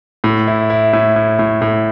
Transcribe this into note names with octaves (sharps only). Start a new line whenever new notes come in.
A2
E4
E4
A2
A2
A2
A2